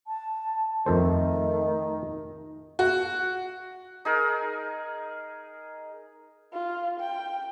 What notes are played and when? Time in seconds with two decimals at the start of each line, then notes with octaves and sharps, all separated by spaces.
0.07 A5
0.86 F2 D#3 A3 A4 C5
1.85 D#4
2.79 F#4
4.05 D#4 G#4 A#4
6.53 F4
7.00 G5